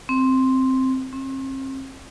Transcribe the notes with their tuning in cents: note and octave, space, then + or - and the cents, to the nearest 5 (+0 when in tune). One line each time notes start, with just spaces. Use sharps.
C4 +0
C4 +40